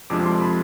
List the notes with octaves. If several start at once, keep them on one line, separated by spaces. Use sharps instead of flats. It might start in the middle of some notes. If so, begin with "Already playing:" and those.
F2 C3 F3 G#3 D4 D6
C6
B5